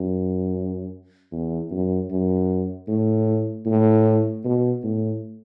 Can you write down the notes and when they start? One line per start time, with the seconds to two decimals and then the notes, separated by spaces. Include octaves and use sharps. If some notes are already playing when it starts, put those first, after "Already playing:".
Already playing: F#2
1.32 E2
1.71 F#2
2.11 F#2
2.88 A2
3.66 A2
4.44 B2
4.83 A2